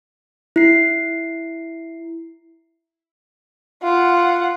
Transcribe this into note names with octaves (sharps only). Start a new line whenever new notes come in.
E4 C7
F4 F#5